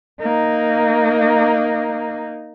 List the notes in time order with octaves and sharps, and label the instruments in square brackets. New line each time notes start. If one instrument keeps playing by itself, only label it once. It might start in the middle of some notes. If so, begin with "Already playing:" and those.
[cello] A#3 D#4